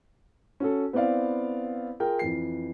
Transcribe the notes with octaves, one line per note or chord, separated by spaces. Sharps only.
C#4 F#4 A4
B3 C4 E4 D5 F5
F4 G#4 A#4 G5
F2 E3 C7